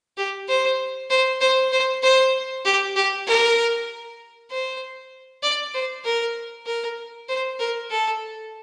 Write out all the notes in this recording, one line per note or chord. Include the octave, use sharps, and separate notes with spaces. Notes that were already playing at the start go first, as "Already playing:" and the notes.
G4
C5
C5
C5
C5
C5
G4
G4
A#4
C5
D5
C5
A#4
A#4
C5
A#4
A4